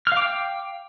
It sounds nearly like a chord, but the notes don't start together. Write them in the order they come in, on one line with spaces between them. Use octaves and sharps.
F6 F5 D6 G5